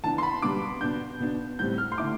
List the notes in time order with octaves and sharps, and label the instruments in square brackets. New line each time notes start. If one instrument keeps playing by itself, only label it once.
[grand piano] E3 B3 D4 [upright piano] A5
[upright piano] C6
B5
[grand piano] B2 G3 B3 D4 [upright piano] D6
[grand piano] B2 B3 D4 [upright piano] G6
[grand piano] B2 B3 D4
[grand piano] A2 G3 C4 [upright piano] G6
[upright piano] F6
C6
[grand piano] D3 A3 E4 [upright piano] D6